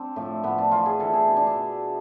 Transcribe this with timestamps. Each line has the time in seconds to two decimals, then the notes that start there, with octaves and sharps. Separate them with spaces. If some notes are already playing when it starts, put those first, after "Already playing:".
Already playing: C4 D4
0.16 A2 F3
0.43 A2 F3 B3
0.58 D4
0.71 A2 E3 F4
0.86 G#4
1.00 A2 E3 A4
1.13 G#4
1.28 B2 E4
1.37 D4
1.47 D4
1.56 B2